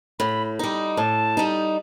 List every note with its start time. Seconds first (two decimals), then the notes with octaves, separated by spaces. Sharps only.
0.19 A2 B5
0.59 G3 D#4
0.97 A2 A5
1.37 G3 D#4